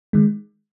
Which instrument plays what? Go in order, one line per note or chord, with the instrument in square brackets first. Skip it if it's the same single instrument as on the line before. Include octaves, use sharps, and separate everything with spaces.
[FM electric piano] D#3 G#3